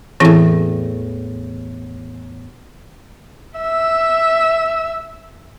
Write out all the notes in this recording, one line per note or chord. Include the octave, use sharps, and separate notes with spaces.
E2 A2 E3 C4 E4
E5 E6